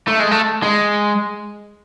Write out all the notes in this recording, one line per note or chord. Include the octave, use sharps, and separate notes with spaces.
A3
G#3
A3
G#3